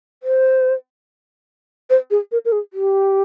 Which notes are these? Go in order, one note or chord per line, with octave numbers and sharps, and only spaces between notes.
C5
C5
G#4
A#4
A#4
G#4
G4